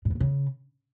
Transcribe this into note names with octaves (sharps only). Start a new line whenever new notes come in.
A#2
G2
A2
C#3